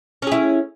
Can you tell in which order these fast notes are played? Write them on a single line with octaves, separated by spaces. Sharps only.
C#4 G#4 E4